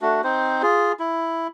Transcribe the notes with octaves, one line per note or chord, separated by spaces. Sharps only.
A3 D4 F#4
C4 D#4 C5
F4 G#4
E4